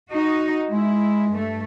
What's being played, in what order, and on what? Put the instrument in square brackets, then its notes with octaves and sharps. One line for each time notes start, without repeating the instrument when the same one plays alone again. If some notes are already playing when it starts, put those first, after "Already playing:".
[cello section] D#4 F#4 D#5
[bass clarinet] G#3 [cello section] E4
[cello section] G2 A3